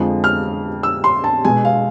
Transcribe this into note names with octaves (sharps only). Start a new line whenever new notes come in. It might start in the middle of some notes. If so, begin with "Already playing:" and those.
Already playing: F2 D3 F3 G#3
F6
E6
C6
A5
B2 G#3 G#5
F5